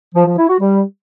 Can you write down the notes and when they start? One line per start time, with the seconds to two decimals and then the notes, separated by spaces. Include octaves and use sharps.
0.15 F3
0.26 F3
0.37 E4
0.49 F#4
0.60 G3